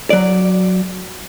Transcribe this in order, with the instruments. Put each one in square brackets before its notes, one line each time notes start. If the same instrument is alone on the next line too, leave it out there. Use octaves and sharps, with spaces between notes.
[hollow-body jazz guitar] F#3 D5